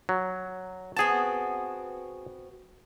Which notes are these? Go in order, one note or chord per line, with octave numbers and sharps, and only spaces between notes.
F#3
B3 C4 F#4 G#4 A5